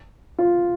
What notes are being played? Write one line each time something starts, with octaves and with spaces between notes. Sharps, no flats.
F4